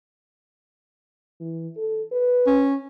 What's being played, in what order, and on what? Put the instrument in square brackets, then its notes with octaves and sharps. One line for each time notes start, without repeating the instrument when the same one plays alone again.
[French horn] E3
A4
B4
[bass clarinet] C#4